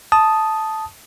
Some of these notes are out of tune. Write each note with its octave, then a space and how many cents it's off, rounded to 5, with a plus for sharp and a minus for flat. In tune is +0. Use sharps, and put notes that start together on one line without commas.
A5 -5 D#6 +0